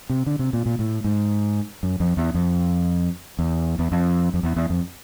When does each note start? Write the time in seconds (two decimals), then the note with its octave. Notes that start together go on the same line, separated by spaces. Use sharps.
0.10 C3
0.27 D3
0.39 C3
0.53 A#2
0.66 A#2
0.79 A2
1.04 G#2
1.83 F#2
2.00 F2
2.17 E2
2.34 F2
3.39 E2
3.79 E2
3.92 F2
4.34 F2
4.43 E2
4.56 E2
4.70 F2